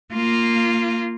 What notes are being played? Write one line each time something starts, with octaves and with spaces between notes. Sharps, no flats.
A#3 F4